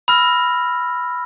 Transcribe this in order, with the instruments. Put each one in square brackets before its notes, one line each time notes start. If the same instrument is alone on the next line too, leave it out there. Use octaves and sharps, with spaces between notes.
[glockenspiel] B5 E6 F6 A#6